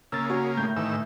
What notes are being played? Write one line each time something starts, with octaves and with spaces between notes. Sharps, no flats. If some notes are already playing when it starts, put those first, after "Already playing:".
C#3 A#3 E6 A6
C#4 F#4
A2 A3 G6
A2 D#3 E3 E6